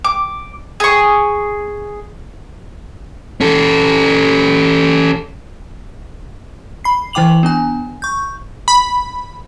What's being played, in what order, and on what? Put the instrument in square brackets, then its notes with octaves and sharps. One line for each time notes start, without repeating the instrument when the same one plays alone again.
[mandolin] D6
G#4 C#6
[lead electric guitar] C#4 A4
[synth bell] B5 C7
E3 E4 G5 D6 F7 F#7
B3 D4 G#5
C#6 G6
[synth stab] B5